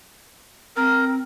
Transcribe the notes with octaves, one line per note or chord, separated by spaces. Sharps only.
C4 A#4